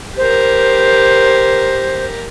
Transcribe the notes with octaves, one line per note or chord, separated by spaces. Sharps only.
G4 A#4 C5